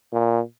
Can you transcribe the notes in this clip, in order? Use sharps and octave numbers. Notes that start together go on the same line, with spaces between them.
A#2